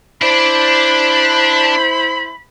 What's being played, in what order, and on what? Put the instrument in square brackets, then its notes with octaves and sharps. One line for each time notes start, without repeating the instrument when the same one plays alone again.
[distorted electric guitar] D4 D5 [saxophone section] E4 C5 [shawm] B5